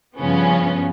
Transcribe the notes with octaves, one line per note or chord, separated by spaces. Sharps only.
G2 C#3 F3 B3 C#4